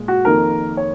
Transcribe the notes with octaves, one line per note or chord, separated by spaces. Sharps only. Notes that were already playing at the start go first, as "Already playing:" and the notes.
Already playing: A#2 G#3
F#4
F2 D#3 A#3 A#4
C#5